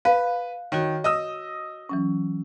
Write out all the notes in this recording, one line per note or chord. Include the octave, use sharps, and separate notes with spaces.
B4 F5
D#3 F#4 C#5
D#5 D#6 E6
E3 F#3 C#4